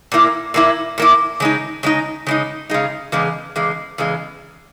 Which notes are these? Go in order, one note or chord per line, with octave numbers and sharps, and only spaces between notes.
A#2 A#3 E4
A#2 A#3 E4
A#2 A#3 E4
C#3 G#3 D#4
C#3 G#3 D#4
C#3 G#3 D#4
C#3 G#3 D#4
E2 C#3 G#3
E2 C#3 G#3
E2 C#3 G#3